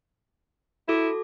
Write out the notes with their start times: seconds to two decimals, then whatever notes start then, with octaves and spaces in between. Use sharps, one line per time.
0.88 E4 F#4 A4 D6